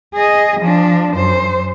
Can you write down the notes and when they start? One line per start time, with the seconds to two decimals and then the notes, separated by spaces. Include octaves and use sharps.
0.15 G#4 D#5
0.60 F3 D4
1.15 F#2 C5